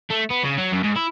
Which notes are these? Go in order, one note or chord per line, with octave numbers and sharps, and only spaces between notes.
A3
B3
C#3
F#3
F#2
G#2
E4